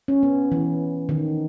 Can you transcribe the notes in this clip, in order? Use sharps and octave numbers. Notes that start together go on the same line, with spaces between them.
C#4
B3
E3
D#3